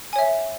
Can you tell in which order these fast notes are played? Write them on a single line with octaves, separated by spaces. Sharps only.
G#5 C#5 E5